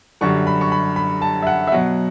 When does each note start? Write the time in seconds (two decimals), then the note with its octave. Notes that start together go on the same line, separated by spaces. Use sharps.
0.21 F#2 D3 G3 C#6
0.47 B5
0.61 C#6
0.72 B5
0.96 B5
1.22 A5
1.42 E5
1.47 F#5
1.67 E5
1.72 B2 F#3 F#5